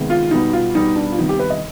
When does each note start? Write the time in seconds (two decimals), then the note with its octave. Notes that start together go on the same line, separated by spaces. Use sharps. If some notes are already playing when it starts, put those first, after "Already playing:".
Already playing: C3 D#3 G#3 B3
0.10 F4
0.31 B2 G3 B3 D#4
0.53 F4
0.75 B2 G3 B3 D#4
0.96 D4
1.12 F4
1.18 C3 D#3 G3 B3 D#4
1.29 G4
1.39 B4
1.50 D#5